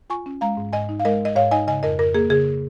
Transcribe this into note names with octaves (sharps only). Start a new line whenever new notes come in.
F4 G#5 C#6
C#4
G#3 F5 A#5
G#2
G#2 D#5 G#5
D#4
F5
G#3 A#4 D#5
G#2 D#5
G#2 C#5 F5
D#4 D#5 G#5
C#3 D#5 G#5
F2 A#4 D#5
F2 A#4
A#3 G#4
C#3 G#4